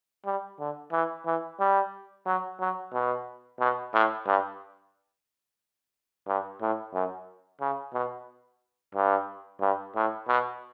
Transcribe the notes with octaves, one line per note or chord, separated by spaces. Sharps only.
G3
D3
E3
E3
G3
F#3
F#3
B2
B2
A2
G2
G2
A2
F#2
C#3
B2
G2
G2
A2
B2